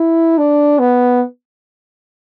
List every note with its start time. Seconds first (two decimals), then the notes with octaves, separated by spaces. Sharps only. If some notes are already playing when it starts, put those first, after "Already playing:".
Already playing: E4
0.38 D4
0.79 B3